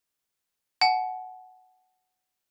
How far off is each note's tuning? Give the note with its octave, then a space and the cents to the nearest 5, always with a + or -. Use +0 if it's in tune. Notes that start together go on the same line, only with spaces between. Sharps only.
F#5 +0 A5 -45